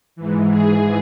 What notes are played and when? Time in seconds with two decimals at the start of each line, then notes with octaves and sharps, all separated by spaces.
0.16 G#2 E3
0.51 G#4